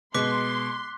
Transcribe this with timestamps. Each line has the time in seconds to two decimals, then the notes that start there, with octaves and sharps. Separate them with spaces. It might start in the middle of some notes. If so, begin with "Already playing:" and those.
0.14 B2 G#3 B3 C6 D6 F#6 B6